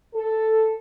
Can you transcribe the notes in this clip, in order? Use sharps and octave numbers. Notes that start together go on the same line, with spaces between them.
A4